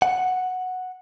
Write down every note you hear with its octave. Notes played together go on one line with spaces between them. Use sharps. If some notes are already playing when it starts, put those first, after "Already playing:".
F#5